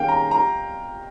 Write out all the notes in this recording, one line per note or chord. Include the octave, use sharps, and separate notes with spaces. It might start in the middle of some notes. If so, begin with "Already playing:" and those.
Already playing: D#3 A#3 C#4 G#4 F5 G5
A#5
A#5